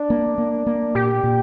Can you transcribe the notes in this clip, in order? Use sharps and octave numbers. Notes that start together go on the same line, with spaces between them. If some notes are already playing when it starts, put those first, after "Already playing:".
Already playing: D4
A#3
A#3
A#3
A#2 G4
A#2